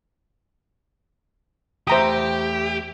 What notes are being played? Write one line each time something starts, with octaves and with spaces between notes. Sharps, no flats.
E2 A3 G4 C5 E5 A#5 D#6